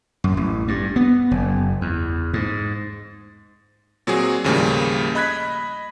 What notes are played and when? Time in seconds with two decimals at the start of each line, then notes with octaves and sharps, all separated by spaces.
0.24 F#2
0.37 A1
0.68 G2
0.96 B3
1.31 F#1
1.81 E2
2.33 G#2
4.07 A#2 F#3 C4 F#4 G#4
4.44 D#2 A2 C#3 F3 G3 A#3
5.15 D#5 B5 F#6 G#6 B6